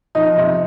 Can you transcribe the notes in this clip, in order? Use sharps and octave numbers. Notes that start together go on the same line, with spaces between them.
F2 D#4
C3